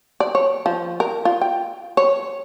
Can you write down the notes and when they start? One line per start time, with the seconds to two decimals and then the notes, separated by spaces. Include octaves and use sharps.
0.20 D5
0.35 C#5
0.66 F3
1.00 A#4
1.25 F4
1.41 G5
1.97 C#5